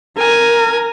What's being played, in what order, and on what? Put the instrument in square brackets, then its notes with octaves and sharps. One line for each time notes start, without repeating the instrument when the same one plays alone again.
[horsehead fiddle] A#4 [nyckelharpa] G#5